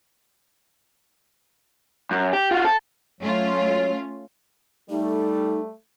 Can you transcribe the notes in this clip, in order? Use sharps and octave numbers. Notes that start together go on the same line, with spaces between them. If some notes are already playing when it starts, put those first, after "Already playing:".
F#2
G4
F4 F#4
A4
F#3 A3 C#4 F4
G3 A3 D#4